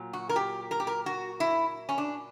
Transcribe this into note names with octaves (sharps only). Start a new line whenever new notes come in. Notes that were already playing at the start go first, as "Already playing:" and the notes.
Already playing: A#2 F#3
F#4
A#4
G4
A#4
G4
A#4
F#4
E4
C#4
D4